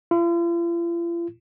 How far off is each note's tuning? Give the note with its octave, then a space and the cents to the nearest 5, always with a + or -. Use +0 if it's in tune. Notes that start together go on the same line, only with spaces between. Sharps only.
F4 -45